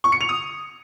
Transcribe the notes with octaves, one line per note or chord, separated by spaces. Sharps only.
C#6
C#7
F7
D#6